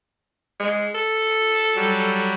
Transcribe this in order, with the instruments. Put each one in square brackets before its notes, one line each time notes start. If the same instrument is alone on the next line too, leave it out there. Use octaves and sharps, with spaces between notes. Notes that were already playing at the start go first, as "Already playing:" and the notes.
[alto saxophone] G#3
A4
[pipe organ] F#3 G3